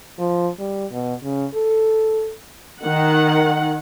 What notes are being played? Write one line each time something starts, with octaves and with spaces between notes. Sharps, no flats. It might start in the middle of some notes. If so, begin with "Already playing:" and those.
F3
G3
B2
C#3
A4
D#3 F#5